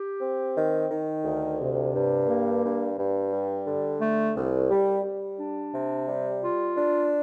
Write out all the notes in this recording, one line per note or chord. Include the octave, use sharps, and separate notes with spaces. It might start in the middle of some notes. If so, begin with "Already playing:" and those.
Already playing: G4
C4
D#3
D#3
D2
C3
G2
A#3
G2
G2
G3
D3
A3
C2
G3
G3
D4
C3
G3
F4
D4